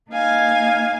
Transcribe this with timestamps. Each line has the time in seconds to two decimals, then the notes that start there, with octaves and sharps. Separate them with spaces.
0.11 A#3 D#4 F5 G#5 G#6